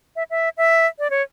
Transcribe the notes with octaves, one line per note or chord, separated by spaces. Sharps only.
E5
E5
E5
D5
C#5